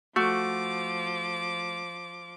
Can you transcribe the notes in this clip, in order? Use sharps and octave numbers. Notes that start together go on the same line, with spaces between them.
F3 A3 F#4 D6